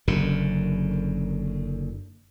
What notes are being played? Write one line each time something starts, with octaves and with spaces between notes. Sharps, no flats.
F#1 F#2 D3